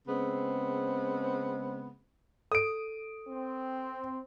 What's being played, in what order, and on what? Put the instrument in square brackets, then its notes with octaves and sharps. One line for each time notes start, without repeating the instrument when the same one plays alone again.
[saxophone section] C#3 G#3 B3 C4
[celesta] A4 [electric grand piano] D#6 D7
[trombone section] C4